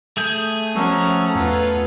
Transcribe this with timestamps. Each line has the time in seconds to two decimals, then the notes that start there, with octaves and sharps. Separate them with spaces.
0.17 A3 G#4 G6
0.75 F3 C#4 F#4 A4 A#5
1.35 E2 F4 A4 B4 C#5 F#5